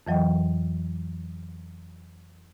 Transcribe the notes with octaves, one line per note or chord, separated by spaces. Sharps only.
F2 E3 F#3 D#5 G5